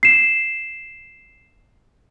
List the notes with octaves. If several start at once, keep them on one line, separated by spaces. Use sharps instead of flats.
C7 E7